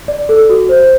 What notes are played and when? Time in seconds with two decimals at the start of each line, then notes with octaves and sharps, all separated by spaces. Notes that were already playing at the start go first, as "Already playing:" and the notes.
0.08 D5
0.29 A4
0.49 F#4
0.69 C5